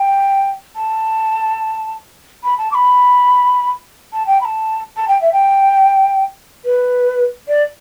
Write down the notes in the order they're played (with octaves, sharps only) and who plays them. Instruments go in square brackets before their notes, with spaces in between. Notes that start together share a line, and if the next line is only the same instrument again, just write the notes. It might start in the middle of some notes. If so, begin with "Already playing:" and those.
Already playing: [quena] G5
A5
B5
A5
D6
B5
A5
G5
B5
A5
A5
G5
E5
G5
B4
D5